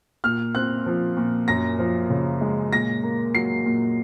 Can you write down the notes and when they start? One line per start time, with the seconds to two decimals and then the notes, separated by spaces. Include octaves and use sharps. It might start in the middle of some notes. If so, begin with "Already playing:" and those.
0.24 A#2 F6
0.55 C4 F#6
0.86 F3
1.17 A#2
1.48 F#2 A#6
1.79 F3
2.10 C#3
2.41 G#3
2.72 A#2 A#6
3.03 A#3
3.35 F#3 C7
3.66 A#2